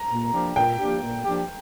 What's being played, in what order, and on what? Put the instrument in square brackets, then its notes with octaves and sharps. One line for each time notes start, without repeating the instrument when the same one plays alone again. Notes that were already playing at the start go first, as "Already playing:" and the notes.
Already playing: [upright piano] A#5
[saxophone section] A#2
F3 A#3 D4 G4
[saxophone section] A#2 [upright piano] G5
[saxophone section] F3 A#3 D4 G4
A#2
F3 A#3 D4 G4